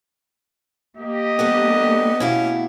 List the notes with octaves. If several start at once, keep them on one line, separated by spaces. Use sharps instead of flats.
A#3 G4 D#5
G3 B3 D4 A4
B2 C#4 E4 F5